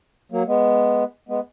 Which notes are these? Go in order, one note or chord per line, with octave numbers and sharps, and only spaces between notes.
F#3 A#3
G#3 B3
G#3 B3